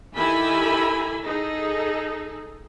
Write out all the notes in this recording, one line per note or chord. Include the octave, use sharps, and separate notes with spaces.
D#3 E4 G4 A4 G#5 B5
D#4 G#4 A4